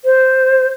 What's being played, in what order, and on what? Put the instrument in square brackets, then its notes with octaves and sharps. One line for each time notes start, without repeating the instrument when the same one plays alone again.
[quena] C5